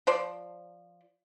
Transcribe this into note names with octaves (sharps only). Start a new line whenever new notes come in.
F3 C5 D5